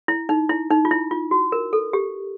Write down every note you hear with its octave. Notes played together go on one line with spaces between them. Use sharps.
E4
D#4
E4
D#4
F4
E4
F4
F#4
A#4
A4
G4